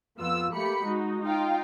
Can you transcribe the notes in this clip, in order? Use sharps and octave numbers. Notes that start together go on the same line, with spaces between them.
F2 B3 F4 E6
A3 A#3 G4 B5 C#7
G#3 D#4 F#4
D#4 F4 F5 G5